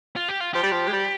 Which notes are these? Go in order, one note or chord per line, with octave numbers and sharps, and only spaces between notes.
F4
G4
F4
F3 G4
G3
F3
G#3
G3